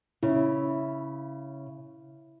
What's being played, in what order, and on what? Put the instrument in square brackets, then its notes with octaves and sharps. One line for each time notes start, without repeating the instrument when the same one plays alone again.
[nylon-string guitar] C#3 [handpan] E4